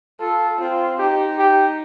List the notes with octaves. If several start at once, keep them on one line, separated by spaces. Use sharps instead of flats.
F4 A4
C4 F4
D#4 G4
G4